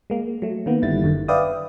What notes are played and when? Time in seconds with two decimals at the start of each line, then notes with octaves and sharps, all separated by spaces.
0.10 G#3 A#3
0.42 F#3 A3
0.66 D#3 A#3 B3
0.82 G1 D3 D#3 G3 E4 A6
1.04 F#2 D3 D#3
1.28 B4 D5 E5 F5 G5 D#6